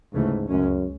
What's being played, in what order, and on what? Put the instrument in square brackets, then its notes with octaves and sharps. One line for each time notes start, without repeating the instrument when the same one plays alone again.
[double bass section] D2 C#3 E3 A3 C#4 [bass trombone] G#2
[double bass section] C#2 C#3 G#3 C#4 [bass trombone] F#2